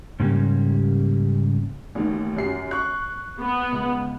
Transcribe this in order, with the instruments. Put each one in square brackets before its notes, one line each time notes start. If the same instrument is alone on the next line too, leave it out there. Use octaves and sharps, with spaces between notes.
[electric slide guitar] G#2 C#3 G3 A#3 C#4 G4
[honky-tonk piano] A1 D#2 D#3
F#2 G4 C7
C#6 F#6
[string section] B3
[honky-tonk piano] C#2